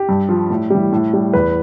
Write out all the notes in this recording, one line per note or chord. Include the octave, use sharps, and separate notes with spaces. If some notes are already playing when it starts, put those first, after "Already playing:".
Already playing: G4
G2
F3
A2
E3 G3
A2
G3
E2 B4